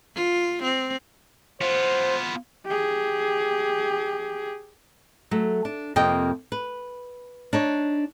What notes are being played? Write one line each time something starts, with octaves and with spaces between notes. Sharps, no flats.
F4
C4
B3 F4 C5
G4 G#4
F#3 A3
D4
F2 C3 A#3 D#5 G5
B4
D4 D#4 C#5